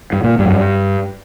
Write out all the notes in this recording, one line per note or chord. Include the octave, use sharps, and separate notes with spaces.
G2
A#2
G2
F#2
G2